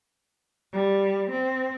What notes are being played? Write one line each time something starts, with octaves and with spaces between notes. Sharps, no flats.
G3
C4